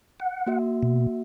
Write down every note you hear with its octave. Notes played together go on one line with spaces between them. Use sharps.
F#5
A#3 F#4 E5
B2